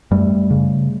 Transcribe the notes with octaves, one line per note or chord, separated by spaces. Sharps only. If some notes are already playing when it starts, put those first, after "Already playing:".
F#2 G3 A3
C#3